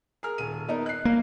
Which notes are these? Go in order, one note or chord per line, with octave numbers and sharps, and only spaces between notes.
G#4 A#4 F6
D#1 D#7
B3 D#4 A#4
F#6 C7
A#3